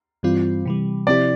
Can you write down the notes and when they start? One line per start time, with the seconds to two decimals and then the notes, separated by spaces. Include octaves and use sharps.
0.23 G2 E3 G3 C4 F4
0.65 C3 E3 G3
1.07 C3 F3 C4 E4 G4 D5